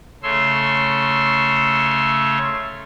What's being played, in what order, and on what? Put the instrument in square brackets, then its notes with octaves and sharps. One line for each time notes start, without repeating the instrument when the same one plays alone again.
[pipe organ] C#3 A3 C#5 C6 E6